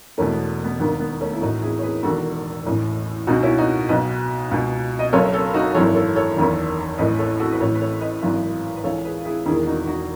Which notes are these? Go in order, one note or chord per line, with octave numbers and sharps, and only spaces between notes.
E1 E2 B2 A3 C#4
B3
B3
E1 D#2 D#3 B3
B3
A3 C#4
E4
A1 A2 E3 D#4 F#4
E4 G#4
C#5
G#4 B4
E1 E2 D#3 F#4 A4
A1 A2 E3
C#2 B2 D#4 F#4
C#4 E4
D#4 F#4
B1 B2 B4 D#5
C#2 B2
D#5
F#1 F#2 C#3 A4 C#5
A4 C#5
D#4 F#4
G#1 F#2 E3 A4 C#5
A4 C#5
A4 C#5
F#1 E2 D#3
A1 A2 E3 B4 D#5
A4 C#5
F#4 A4
B4
A1 A2 E3 A4 C#5
B4
A4 C#5
B4 D#5
G#1 F#2 C#3 E3
B4
C#2 C#3 E3 A4 C#5
G#4 B4
E4 G#4
E1 E2 D#3 E4 G#4
D#4 F#4
D#4 F#4